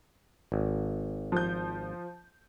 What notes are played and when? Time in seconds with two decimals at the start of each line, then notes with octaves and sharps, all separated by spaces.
0.52 G#1
1.32 F3 G6